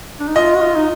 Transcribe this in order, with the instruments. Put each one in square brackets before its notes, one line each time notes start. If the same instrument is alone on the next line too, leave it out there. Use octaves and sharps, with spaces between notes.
[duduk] D4
D#4
[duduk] F4 [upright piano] D#5
[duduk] F#4
F4
D#4